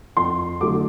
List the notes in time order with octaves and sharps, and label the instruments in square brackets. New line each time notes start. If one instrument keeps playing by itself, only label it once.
[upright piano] F2 C6
D3 F#3 A3 D6